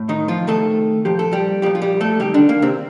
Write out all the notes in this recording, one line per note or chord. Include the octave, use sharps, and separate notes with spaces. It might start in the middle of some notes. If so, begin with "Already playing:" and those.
Already playing: A2
D#3 D#4
F3 F4
C3 D#3 A3 A4
A#2 F3 G4
A4
G3 G4
A#2 F3 G3 G4
F4
G3 G4
A3 A4
C3 D#3 G3 G4
D3 D4
A#3
C3 C4